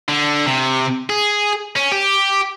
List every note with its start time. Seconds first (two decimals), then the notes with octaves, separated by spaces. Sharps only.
0.08 D3
0.46 C3
1.10 G#4
1.76 C#4
1.92 G4